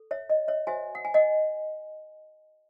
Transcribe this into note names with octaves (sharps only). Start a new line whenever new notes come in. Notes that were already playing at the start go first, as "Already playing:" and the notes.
Already playing: A4
C#5 E5
D#5
C#5 E5
F#4 C5 E5 G#5
F#5
G#5
D#5 F#5